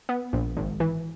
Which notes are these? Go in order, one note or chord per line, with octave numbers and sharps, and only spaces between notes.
B3
A#1
G#1
E3